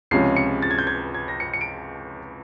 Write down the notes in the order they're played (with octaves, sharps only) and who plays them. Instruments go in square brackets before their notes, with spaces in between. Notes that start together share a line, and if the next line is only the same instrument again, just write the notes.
[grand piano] C#2 C3 F3 G#3 C#4 C7
C#7
A6
G#6
G6
G#6
G#6
A#6
C#7
C#7
D7